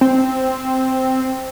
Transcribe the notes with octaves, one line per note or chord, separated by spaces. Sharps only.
C4